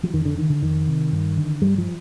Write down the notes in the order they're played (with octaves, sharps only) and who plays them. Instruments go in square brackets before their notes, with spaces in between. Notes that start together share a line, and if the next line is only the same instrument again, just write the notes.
[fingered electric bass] F3
F2 D#3
D3
D3 D#3
D3
F2 D#3
C3
G2
D3
G2 G3
F3